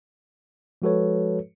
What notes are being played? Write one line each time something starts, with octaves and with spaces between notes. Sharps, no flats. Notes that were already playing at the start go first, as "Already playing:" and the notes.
F3 G#3 F#4 A4 B4 C#5